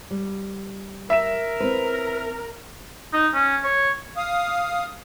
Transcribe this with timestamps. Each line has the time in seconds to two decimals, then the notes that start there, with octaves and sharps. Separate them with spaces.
0.11 G3
1.10 A#4 E5 E7
1.60 C4 E4 B4
3.13 D#4
3.34 C#4
3.64 C#5
4.17 F5 D#6